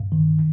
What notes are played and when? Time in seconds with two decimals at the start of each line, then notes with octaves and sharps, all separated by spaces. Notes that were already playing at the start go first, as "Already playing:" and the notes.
Already playing: G2
0.12 D#3